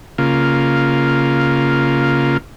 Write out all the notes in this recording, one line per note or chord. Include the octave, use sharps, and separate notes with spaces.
C#3 A#3 F4